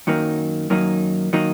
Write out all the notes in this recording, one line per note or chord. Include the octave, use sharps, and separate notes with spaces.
F#2 D#3 F#3 A#3 D#4
F#2 D#3 F#3 A#3 D#4
D#3 F#3 A#3 D#4